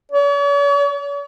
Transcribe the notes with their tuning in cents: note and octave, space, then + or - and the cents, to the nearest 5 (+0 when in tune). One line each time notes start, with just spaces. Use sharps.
C#5 +45